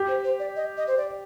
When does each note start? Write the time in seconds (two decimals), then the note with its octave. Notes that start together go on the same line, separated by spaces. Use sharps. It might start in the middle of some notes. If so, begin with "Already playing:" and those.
Already playing: G4
0.08 C5
0.24 C5
0.40 D5
0.56 D#5
0.77 D#5
0.88 C5
0.98 D5